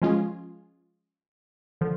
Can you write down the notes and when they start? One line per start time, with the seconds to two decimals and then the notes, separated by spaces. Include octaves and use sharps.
0.02 F3 G#3 C#4 F4 G#4
1.81 D3 F3